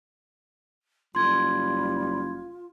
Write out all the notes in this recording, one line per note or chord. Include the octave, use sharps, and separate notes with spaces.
F#1 G3 F4 C6 G#6